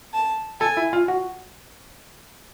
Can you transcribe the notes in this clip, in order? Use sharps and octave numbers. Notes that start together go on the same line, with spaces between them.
A5
A4 G#5
E4
F4
F#4